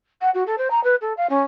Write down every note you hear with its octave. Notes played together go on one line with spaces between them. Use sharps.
F#5
F#4
A4
C5
A#5
B4
A4
F5
C#4